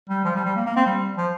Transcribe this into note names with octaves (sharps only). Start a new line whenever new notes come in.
G3
F3
G3
G3
A#3
A#3
C4
G3
F3